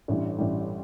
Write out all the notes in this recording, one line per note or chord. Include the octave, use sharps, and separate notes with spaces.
A1 G2 E3 G3
A1 G2 E3 G3